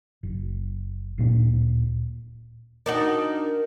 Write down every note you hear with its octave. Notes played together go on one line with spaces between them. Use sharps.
F#1
D1 A#2 B3 D4
D4 D#4 F#4 A#4